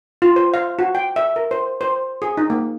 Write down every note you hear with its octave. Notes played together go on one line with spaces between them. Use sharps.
F4
C5
F5
F#4
G5
E5
A#4
C5
C5
G#4
D#4
A#3